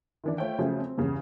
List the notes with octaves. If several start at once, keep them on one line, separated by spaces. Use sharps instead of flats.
D#3 E3 D4
A3 F4 C5 C#5 E5 G5
C#3 F3 F#3 A3 C#4 C5
C4
E2 G2 C#3